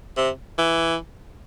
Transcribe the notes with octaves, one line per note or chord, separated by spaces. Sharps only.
C3
E3